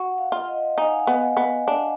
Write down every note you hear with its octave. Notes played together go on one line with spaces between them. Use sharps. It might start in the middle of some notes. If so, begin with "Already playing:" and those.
Already playing: F#4 F#5
F5
F4
D#5
D#4 G#5
F#5
F5
F#5
B3
B3
D4